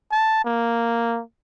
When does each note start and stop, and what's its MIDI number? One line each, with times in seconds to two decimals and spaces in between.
0.12 0.42 81
0.45 1.21 58